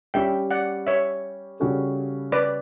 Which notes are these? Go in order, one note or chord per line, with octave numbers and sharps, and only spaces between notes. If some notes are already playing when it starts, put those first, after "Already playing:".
G3 C#4 G4 E5 G5
D5 F#5
C#5 E5
C#3 G3 C#4 F#4 A4
B4 D5